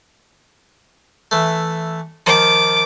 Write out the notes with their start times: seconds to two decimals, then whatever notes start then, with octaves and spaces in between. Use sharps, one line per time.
1.31 E3 A3
2.26 D#3 F3 D6